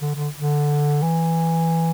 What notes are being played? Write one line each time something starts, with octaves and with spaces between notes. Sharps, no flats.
D3
D3
D3
E3